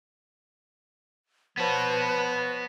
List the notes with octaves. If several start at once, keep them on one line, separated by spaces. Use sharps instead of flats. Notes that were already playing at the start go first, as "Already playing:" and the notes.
F3 B3 F#4 B4 C#5